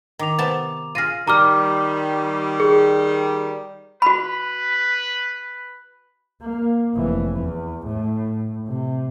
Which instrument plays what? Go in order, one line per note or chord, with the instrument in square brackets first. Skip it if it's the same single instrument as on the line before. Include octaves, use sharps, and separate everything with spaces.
[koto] D#3 [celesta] A#5 D6 F7
[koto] C3 B3 A5
[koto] F4 G#4 [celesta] F6 A#6 D#7
[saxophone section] D#3 G3 [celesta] A#5 D6 F6
[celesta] G#4
[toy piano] F#4 B5 [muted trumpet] B4
[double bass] A#3
F1 E3
E2
A2
C3